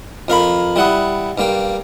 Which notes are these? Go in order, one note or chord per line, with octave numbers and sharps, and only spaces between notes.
F2 A#4 F5 B5
G3 E4 F#5 D#6
G2 A#3 G5